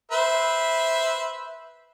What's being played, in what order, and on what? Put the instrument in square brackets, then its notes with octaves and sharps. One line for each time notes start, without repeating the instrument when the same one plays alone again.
[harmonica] B4 C5 E5